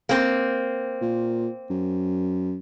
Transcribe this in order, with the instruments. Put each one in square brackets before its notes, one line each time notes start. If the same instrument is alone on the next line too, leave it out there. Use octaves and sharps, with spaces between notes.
[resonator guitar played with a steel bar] A#3 C4
[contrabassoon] A#2
F#2